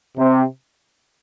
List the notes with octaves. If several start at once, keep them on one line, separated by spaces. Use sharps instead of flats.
C3